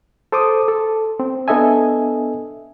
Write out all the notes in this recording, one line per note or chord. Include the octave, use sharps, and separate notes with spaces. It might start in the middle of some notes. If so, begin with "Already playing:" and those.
A4 C5 D6 D#6
A4
C4
B3 D4 A4 D#5 E5 G#5